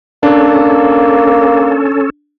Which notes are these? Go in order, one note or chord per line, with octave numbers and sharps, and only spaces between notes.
A#3 C#4 D4 A4